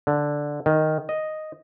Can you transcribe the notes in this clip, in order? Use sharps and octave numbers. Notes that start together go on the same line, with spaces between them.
D3
D#3
D#5